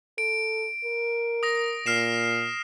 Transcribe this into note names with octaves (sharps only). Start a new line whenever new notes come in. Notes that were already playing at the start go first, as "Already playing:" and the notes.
A4 D7
A#4
D#6 A#6
A#2 F6 C7 E7